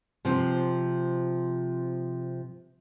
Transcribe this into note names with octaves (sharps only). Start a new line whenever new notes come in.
C3 F3 C4